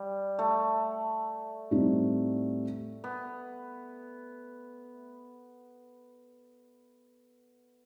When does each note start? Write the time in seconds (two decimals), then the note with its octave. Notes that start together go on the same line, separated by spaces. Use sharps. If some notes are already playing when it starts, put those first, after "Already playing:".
Already playing: G3
0.39 A3
1.71 A2 G3 C4 D#4
3.04 B3